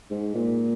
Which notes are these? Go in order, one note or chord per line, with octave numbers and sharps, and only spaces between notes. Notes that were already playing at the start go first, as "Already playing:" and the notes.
G#2
A#2